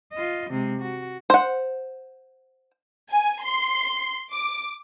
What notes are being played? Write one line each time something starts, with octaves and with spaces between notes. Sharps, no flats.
F4 D#5
C3 G#3
F#4
C5 F#5
G#5
C6
D6